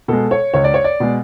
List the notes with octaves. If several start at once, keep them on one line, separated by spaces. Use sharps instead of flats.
B2 G#3 A4
C#5
C#2 C#5
D5
C#5
D5
B2 G#3